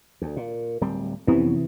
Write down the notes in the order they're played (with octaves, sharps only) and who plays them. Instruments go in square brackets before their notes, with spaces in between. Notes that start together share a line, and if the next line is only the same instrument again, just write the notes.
[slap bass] D2
A#2
D1 G3 C4
[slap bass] F2 B3 C#4 [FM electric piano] C3 E3